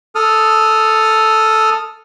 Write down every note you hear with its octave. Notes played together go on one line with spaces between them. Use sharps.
A4 D#6 F6